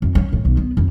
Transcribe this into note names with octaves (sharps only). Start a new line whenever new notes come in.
F2
C#4
A2
B1
B3
F2